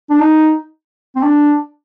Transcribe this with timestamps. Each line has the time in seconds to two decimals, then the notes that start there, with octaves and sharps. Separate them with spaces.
0.10 D4
0.20 D#4
1.16 C4
1.23 D4